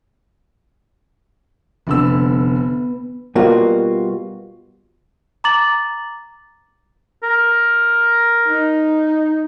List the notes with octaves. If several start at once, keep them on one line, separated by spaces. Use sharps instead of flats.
F1 D3 B3 B4 E6
B2 G3 A#3 F4 F#4
A#5 D6 A6 F#7
A#4
D#4